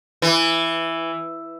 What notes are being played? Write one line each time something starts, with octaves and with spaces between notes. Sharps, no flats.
E3